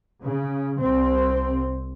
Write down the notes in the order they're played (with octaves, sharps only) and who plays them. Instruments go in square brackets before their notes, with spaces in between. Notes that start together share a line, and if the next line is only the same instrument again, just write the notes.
[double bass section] C#3
C2 C4